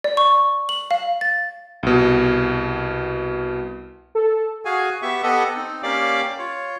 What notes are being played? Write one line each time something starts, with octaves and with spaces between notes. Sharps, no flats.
D5
C#6
F#7
F5
A6
C2 B2
A4
F#4 G#4 F5 G#5
B3 G4 E5 C#6
B3 G4 A4 D#5 F#5
C4 D#4
A#3 C#4 G4 D5 F5 D6
F4 C#5